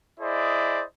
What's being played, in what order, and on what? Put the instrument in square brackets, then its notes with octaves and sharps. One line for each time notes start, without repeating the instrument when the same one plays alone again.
[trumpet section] E4 G#4 C5 D5 D#5